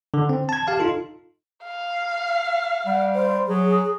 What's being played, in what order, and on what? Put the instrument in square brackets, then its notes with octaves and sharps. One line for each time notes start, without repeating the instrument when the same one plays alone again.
[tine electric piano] D3
C4
A5 G#6
G4 F5 A5
D#4 F4 A4
[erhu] F5
[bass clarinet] G3 [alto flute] F#5
[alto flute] C5
[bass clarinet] F#3 [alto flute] G#4